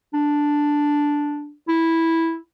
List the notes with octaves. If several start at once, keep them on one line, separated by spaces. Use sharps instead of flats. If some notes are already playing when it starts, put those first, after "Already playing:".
D4
E4